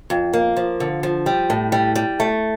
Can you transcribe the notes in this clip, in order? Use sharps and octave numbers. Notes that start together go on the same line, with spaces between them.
F2
A#3
F3
D3
F3
G3
A2
G3
G3
A3